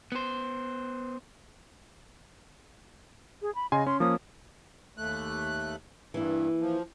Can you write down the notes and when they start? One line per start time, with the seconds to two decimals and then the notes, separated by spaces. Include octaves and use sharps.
0.12 B3 C5
3.42 G#4
3.55 B5
3.72 C#3 D#5 G#5 C6
3.86 C#4 C6
4.00 F3 A#3 C#4 D#6
4.98 D#2 A3 F#6
6.14 G2 E3 A#3 E4
6.61 F3